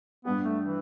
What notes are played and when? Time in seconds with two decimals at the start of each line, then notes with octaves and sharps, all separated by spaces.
0.25 G2 G3 B3 D4 G4
0.44 A3
0.64 E3